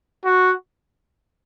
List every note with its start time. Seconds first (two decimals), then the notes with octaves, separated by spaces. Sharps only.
0.24 F#4